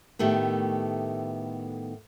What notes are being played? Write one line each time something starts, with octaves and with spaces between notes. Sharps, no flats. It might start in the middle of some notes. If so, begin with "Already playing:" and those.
A2 D#3 A3 B3 G4